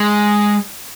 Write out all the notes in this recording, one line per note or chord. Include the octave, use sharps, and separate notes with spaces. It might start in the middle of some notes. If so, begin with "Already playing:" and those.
Already playing: G#3